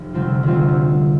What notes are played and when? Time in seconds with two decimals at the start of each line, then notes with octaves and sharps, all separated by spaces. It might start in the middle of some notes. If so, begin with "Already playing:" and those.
Already playing: F1
0.14 D2 C3 G3 C4 F4
0.43 D2 C3 G3 C4 F4